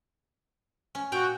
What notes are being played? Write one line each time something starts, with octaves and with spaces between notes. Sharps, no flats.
C#4
A#2 F#4 G5